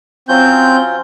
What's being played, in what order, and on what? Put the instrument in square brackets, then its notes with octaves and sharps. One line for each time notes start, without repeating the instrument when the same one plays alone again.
[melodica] F#3 C#4 F4 [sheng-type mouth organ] C4 G6